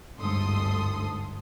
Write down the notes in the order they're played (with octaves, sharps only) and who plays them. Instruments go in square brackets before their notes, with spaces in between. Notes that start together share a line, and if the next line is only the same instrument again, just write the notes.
[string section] G1 D2 G#2 A4 C6 D#6